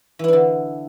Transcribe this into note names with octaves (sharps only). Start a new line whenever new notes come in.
D3 E3 D4 E4